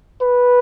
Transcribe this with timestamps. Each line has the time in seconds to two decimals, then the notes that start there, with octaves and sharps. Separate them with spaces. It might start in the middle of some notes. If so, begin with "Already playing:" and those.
0.22 B4